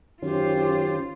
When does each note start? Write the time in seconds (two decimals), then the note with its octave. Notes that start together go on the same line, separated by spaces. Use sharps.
0.22 F#2 D#3 C#4 F4 G4 C5